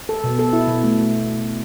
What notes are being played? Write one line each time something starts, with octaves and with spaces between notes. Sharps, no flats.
A4
B2
A4
E4
B2
A3
A3